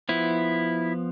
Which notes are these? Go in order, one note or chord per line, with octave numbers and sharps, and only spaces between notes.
F3 B3 E4